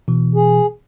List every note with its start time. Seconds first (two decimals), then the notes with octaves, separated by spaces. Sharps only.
0.08 B2 E3
0.35 G#4